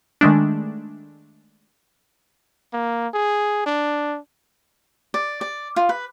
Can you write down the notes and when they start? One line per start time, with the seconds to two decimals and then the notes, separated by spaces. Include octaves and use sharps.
0.21 D#3 G#3 A3 D4
2.73 A#3
3.14 G#4
3.66 D4
5.14 D5
5.41 D5
5.76 F4
5.89 B4